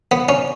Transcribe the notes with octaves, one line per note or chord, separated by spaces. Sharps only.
B3
C#4